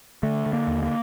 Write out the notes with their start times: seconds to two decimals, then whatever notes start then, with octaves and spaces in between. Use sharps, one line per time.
0.23 D3 A3
0.46 D3
0.53 A#3
0.68 D#2
0.83 A#3